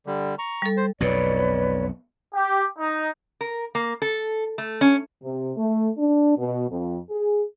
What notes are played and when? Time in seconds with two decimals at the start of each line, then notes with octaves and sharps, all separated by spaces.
0.06 D3 G3
0.39 A#5 C#6
0.62 G3 A4
0.77 C5
1.00 B1 F2 B2 B4 C#5 D5
2.34 G4
2.79 D#4
3.41 A#4
3.75 A#3
4.02 A4
4.58 A3
4.81 C#4
5.23 C3
5.57 A3
5.98 D4
6.37 B2
6.70 F2
7.10 G#4